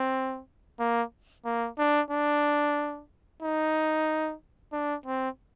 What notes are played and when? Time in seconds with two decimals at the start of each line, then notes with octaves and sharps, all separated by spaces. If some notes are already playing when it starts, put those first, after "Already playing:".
Already playing: C4
0.80 A#3
1.45 A#3
1.78 D4
2.11 D4
3.42 D#4
4.72 D4
5.06 C4